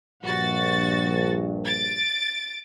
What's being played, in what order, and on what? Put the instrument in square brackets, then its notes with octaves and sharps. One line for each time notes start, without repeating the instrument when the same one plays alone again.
[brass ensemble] A#1 G2 [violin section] F#4 A6
[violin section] A6 D7